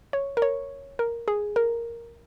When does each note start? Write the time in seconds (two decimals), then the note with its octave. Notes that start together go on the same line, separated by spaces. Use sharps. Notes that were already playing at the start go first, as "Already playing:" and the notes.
0.13 C#5
0.37 A#4
0.42 C#5
0.99 A#4
1.28 G#4
1.56 A#4